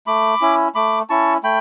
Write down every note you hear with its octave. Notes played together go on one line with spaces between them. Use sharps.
A3 B5 D6
C#4 E4
A3 B5 D6
C#4 E4 A5 C#6
A3 G5 B5